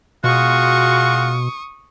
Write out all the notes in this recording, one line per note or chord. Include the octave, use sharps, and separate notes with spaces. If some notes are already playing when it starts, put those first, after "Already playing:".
B2 G#3 F4 F#4 C#6 D#6